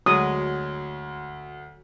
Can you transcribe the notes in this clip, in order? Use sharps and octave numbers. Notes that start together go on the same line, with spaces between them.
D2 F#3 G#3 D#6